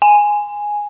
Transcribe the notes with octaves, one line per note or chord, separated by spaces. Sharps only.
G#5